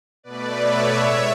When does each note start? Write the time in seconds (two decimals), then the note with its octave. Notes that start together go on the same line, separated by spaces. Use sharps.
0.23 B2 A3 B4 D5
0.60 C#5 E5
0.97 A2 G#3